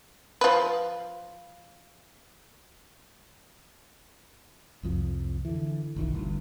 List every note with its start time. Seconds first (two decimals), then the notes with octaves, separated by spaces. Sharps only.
0.41 F3 B4
4.83 C2 F2 F3
5.45 D3 E3
5.96 F#1 B1 D#3 E3
6.12 G1 D2 G2